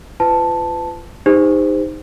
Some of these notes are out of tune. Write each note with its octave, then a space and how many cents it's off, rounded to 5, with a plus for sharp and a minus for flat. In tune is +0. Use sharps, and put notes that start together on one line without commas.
F4 -30 B4 +30 A5 +0
D#4 +0 G4 +40 C5 -20